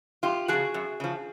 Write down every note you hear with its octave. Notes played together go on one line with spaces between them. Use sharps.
F#2 F4 G4
C#3 F3 F#4 G#4
F#2
C#3 F3